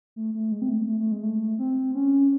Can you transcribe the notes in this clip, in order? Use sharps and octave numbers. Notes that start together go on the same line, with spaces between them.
A3
A3
G#3
C4
A3
A3
A3
G#3
A3
C4
C#4